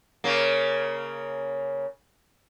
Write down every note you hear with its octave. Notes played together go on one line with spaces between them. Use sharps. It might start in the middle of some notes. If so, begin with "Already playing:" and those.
C#3 A#3